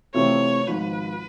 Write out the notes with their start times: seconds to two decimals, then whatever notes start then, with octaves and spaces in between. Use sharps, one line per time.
0.14 C3 E3 A3 C4 F4 C#5
0.67 G#1 G#2 F3 B4